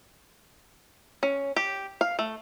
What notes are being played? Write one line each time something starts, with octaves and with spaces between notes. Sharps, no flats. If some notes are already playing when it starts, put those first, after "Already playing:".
C#4
G4
F5
A3